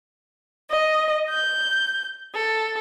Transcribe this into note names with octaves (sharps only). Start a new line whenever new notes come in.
D#5
G6
A4